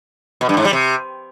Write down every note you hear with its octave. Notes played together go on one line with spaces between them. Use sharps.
B2
G2
G#2
G3
C3